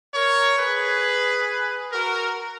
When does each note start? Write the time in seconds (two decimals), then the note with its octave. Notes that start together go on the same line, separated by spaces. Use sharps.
0.14 A#4 C#5
0.58 G#4 B4
1.92 F#4 A#4